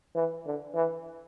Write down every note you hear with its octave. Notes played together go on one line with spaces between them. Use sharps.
E3
D3
E3